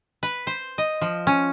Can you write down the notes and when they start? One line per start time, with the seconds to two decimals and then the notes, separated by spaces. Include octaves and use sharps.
0.23 B4
0.47 C5
0.78 D#5
1.01 F3
1.27 C#4